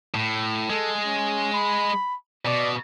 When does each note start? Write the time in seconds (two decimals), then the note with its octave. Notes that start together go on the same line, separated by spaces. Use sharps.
0.14 A2
0.70 G#3 A4
1.05 C#4
1.53 B5
2.46 B2 D5